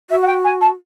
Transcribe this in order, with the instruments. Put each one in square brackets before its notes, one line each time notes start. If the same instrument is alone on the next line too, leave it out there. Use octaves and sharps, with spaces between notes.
[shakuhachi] F#4 [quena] E5
[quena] F#5
G5
G#5
A5